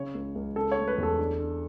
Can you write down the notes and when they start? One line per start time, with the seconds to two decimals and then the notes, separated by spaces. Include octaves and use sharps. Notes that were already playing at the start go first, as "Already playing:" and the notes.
Already playing: C#3 C#5
0.15 C#2
0.35 C#2
0.56 C#3 A4
0.72 C#5
0.77 A3
0.88 B4
0.98 E2
1.03 A4
1.19 D4
1.40 D4